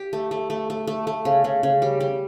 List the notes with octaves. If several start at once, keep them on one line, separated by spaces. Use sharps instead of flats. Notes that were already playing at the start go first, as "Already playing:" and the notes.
Already playing: G4
A3
A3
A3
A3
A3
A3
C#3
C#3
C#3
G3
G3